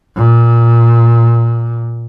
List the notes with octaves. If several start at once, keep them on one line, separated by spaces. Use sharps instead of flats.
A#2